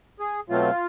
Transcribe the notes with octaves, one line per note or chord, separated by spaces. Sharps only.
G#4
B2 F#3 A3 C4 F4